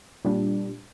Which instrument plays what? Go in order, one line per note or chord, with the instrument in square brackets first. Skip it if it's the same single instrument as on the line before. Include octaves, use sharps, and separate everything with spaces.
[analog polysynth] A#2 G3 D4